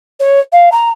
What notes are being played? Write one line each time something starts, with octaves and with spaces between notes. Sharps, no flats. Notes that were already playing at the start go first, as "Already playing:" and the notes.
C#5
F5
A#5